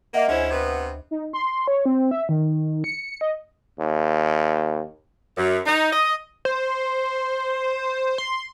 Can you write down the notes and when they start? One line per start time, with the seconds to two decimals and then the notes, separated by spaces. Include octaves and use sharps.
0.14 A#3 D#5 E5 F#5
0.28 D2 G#3 C#4 E4 C5
0.51 C3 B3
1.11 D#4
1.33 C6
1.68 C#5
1.86 C4
2.11 E5
2.29 D#3
2.84 C#7
3.21 D#5
3.80 D#2
5.38 F#2
5.66 D#4
5.92 D#5
6.45 C5
8.18 C6